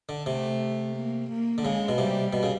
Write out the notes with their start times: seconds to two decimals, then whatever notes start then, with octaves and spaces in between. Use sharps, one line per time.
0.09 D3
0.26 C3 A3
0.95 A#3
1.30 A#3
1.58 D3
1.64 C#3 G#3
1.89 B2
1.98 C3 G3
2.33 B2
2.43 C#3